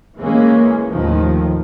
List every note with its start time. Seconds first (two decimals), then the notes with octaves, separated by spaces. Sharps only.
0.17 E3 G#3 A#3 C#4
0.90 D#2 A2 D#3 F3